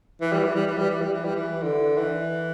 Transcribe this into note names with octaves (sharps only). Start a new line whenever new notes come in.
E3
G3
E3
G3
E3
G3
E3
G3
E3
G3
E3
D3
E3